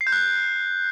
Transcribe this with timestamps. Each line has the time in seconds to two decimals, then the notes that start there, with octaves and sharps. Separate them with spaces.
0.01 C7
0.07 G6
0.12 F#6